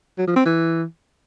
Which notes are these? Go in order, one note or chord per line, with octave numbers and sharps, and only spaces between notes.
F#3
F3
C4
E3